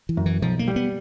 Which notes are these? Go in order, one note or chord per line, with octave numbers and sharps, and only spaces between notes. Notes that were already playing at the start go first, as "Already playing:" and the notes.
E3
F#2
E3
B1 F3
A#3
G3
B3